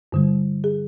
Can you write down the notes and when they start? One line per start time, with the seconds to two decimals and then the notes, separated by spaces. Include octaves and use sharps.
0.12 G2 D3 G3
0.64 G#4